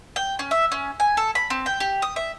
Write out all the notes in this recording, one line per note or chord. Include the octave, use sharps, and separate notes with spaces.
G5
C#4
E5
C#4
G#5
A4
B5
C4
G5
G4
D#6
E5